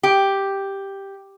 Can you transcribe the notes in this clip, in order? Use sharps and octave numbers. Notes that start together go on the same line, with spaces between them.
G4